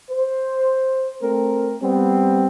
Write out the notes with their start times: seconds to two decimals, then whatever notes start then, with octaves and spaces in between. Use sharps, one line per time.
0.11 C5
1.22 A3 C4 A#4
1.83 G3 B3 C4